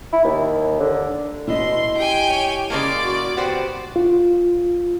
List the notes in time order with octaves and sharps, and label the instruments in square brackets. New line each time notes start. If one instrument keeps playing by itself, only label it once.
[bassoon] E4
D#2
D3
[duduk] B2 [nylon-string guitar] E4 D#5 [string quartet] C6
[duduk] G4 [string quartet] G5 G#5
[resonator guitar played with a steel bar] C#5
[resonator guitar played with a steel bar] C#3 G#3 A#3 [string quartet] D5
[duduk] F#4
[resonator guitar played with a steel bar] B3 F#4 C5 [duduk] G4
[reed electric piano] F4